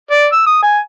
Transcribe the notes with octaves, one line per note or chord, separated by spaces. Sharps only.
D5
E6
D#6
G#5